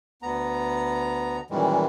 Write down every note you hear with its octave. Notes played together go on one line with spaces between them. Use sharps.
D2 B3 A#5
F#2 A#2 D#3 E3 G3 G#3